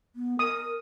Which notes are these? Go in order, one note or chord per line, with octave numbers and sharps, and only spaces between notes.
B3
A#4 D#6